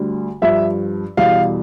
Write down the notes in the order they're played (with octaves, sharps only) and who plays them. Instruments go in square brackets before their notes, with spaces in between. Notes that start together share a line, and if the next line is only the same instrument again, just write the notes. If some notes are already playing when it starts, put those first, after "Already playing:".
Already playing: [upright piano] D2 D3 G3
G2 F3 E5
E2 B2 G3 F5